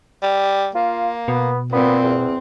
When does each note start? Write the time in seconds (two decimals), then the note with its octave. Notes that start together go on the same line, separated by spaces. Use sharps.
0.23 G3
0.75 A#3 F4
1.28 B2 B3
1.72 A#2 B3 C4
2.04 E2